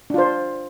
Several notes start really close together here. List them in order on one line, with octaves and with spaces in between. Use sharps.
D4 F4 C5